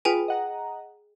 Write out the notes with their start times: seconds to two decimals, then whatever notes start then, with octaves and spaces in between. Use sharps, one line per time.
0.05 F4 G#4 B4 G5 G#5
0.28 D#5 F#5 A#5